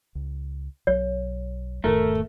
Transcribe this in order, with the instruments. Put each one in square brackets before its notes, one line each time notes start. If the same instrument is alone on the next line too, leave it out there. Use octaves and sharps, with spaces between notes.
[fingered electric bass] C#2
[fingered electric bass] B1 F#3 [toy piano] C#5
[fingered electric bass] E1 G#2 D#3 [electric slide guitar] A3 [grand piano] A#4